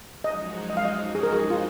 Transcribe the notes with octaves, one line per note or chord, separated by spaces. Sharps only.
F#2 F3 G#3 D#4 F#4 D#5
D#5
F5
D#5
G#4
A#4
G#4
F4